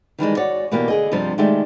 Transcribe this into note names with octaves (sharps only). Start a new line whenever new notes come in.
D#3 E3 G3 G#3
F#4 C#5 D5
B2 E3 A#3 D4 G4
D3 G#4 D#5
G2 C3 F3 G3 C4
D#3 G#3 A3 G4 D5 E5